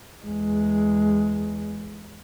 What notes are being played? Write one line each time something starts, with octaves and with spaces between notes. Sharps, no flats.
E2 G#3